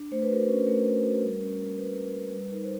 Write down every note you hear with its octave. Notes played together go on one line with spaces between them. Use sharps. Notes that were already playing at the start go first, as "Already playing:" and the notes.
Already playing: D4
A3 C5
B4
F#4 A#4
B4
C#4
A3 A#4
A3
F#4
G3
C#4
A#3
G3 B4
G3
A#4
C#4
G3 B4
D#4 A#4
C5